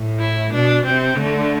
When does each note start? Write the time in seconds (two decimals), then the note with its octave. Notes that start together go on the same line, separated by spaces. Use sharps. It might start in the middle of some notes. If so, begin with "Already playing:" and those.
Already playing: A2
0.19 E4
0.53 B2 D4
0.84 C3 C4
1.17 D3 A3